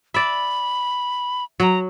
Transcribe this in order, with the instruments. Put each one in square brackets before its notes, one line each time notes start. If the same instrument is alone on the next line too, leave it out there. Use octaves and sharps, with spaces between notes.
[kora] D5 E5 [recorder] B5
[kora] F#3 [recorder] A#5